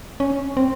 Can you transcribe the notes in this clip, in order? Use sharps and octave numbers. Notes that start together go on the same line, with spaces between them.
C#4
C4